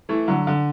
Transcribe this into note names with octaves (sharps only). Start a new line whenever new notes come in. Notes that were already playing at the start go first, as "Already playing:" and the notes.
E3 A3
D3 F#3
D3